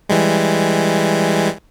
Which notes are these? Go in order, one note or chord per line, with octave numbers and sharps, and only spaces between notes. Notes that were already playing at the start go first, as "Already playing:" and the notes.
E3 G3 G#3